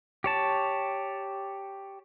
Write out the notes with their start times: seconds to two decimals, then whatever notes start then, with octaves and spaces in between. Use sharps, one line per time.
0.24 G4 C#5 A5